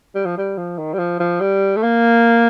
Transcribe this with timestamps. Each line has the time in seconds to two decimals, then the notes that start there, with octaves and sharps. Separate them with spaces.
0.15 G3
0.25 F3
0.37 G3
0.57 F3
0.78 D#3
0.93 G3
0.98 F3
1.20 F3
1.40 G3
1.76 A3
1.83 A#3